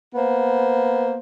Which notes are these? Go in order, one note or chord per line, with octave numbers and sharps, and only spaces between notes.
A#3 B3 C5